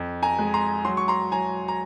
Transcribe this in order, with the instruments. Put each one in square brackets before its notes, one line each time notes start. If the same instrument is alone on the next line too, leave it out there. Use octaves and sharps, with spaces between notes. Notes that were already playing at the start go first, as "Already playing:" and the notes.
Already playing: [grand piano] F2
G#5 A#5
G#3
A#5 C6
F#3 C6
C#6
A#5 C6
F#3 G#5 A#5
A#5